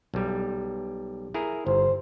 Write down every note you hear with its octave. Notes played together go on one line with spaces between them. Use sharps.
B1 G3
E4 G#4 A#4
G1 C5